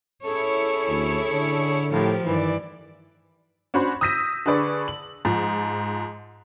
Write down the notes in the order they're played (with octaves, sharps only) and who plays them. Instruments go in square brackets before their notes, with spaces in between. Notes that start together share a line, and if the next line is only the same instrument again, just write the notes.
[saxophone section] C#4 G#4 A4 [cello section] E4 C#5
[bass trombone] D2
D3
[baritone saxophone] A2 [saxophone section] F3 [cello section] G4 A#4
[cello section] G2 D5 [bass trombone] D#3 [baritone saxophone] E3
[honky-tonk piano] C#4 D4 F#4 C5 B5 C6
D#6 E6 G6 A#6 B6 D#7
D3 D4 G#4 B4 D5 C#6
F#7
G#2 F3